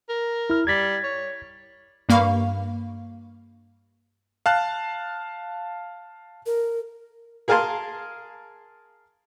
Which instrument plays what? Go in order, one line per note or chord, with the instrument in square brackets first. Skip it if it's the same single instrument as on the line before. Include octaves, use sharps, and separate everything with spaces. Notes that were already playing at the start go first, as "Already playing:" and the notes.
[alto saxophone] A#4
[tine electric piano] E4 F6
[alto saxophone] G3 [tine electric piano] G#6 A6 B6
[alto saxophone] C#5
[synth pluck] G2 A#3 F5 B5 C#6
[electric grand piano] F5 A5 F#6
[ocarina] A#4
[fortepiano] G#4 A#4 F5 G#5 A5 C6